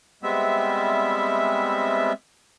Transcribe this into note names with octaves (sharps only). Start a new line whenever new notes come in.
G3 G#3 B3 C4 E5